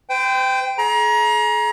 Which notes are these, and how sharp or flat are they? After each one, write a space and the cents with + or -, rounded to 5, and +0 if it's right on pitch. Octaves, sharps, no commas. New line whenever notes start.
C5 -40 G5 +0
G#4 +40 A#5 +30